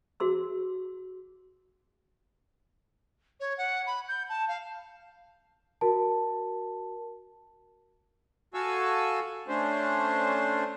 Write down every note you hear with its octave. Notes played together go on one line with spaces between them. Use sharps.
F#4 G#4 C6 E6
C#5
F#5
B5
G6
A5
F5
F#4 A#4 A5
F#4 A4 F5 G#5 C#6 E6
A3 C#4 D4 C5